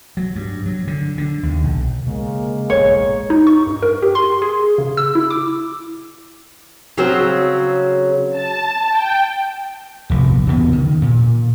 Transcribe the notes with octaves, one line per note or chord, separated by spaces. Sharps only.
F#3
G2
F#3
D3
D3
D#2
B1
C#3 G#3 A#3
E1 A#1 C#5
D#4
C#6
G2
A#4
G4
C6
G#4
C#3
E6
E4
D6
C#3 F#3 C4
A5
G5
F1 A#1
E2 C#3 B3
D#3
A#2